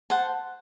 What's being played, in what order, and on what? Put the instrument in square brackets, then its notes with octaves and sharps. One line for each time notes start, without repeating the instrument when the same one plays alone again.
[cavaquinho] C5 F#5 A5